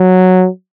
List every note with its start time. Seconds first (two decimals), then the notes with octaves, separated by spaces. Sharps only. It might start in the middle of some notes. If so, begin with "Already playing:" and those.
Already playing: F#3